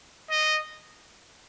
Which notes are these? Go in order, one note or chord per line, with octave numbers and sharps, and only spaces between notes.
D#5